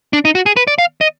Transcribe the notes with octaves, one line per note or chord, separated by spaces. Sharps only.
D4
D#4
F#4
G#4
B4
D5
F5
D#5